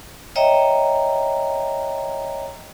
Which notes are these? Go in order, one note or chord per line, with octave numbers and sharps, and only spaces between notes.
C#5 D#5 E5 G5 A#5